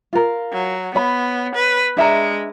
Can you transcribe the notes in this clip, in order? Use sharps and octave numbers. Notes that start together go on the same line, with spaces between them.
F4 A#4
F#3
B3 C#5 B5
B4
G#3 D4 E5 A#5